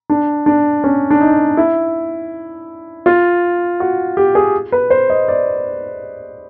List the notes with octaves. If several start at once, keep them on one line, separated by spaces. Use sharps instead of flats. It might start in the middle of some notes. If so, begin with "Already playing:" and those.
D4
D4
C#4
D4
D#4
E4
F4
F#4
G4
G#4
B4
C5
D#5
D5